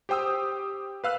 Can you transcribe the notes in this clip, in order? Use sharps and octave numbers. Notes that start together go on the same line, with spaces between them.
G4 C5 G5 D#6 E6
B4 F5 E6 F#6